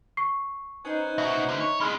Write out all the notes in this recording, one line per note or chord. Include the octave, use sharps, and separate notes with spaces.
C#6 C7
C#4 D#4 B4 C5 D#5 A#5
B2 F#4 E5
D3 A3
C#5
G#3 C4 E4 B5 F6